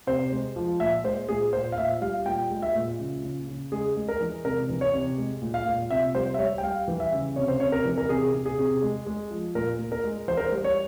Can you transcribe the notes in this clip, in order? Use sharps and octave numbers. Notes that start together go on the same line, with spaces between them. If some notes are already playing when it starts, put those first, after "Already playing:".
C3 C5
G#3
F3
A#2 E5
G#3 C5
A#2 G#4
A#2 C5
F5
A#2 E5
G3 F5
A#2 G5
G#3
E5
A#2
C#3
C#3
C#3
G#3 G#4
G#3
A#4
E3
C3 A#4
E3
C#5
C3
G#3
A#2
F5
A#2
C3 E5
G3 C5
E5
G3 C#5
G5
G3 F5
E3
E5
C#3
C3 C#5
C5
C3 C#5
A#4
E3
A#4
C3 G#4
C3
G#4
C3
G#3
G#3
F3
A#2 A#4
A#2
A#4
G#3
E3 C5
A#4
C5
G3
C#5